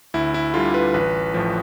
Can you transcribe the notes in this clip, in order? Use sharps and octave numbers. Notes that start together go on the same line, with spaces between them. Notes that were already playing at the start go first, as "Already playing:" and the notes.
D2 E4
E4
D3 G3 F4
B4
A1 B4
A2 F3